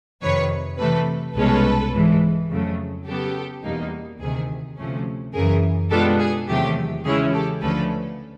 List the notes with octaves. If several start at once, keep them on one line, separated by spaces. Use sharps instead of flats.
F2 C3 D#3 B4 C#5
C3 E3 A3 A4 B4
C2 B2 G#3 C#4 A4 B4
G#2 E3 G#3
F2 C#3 F#3 A3
C#3 F#3 B3 G4 A4
E2 B2 G3 A#3 D#4
D2 C3 D#3 G#4
D2 C3 F3 A3 C#4
F#2 C#3 E3 G#4 A#4
B2 G#3 B3 D4 F4 G4 A4
G#4
E2 C3 D#3 F#3 A3 G4
C#3 E3 G#3 C#4 E4 G#4
G4 A4
D2 D3 F3 A3 C#4 A4 B4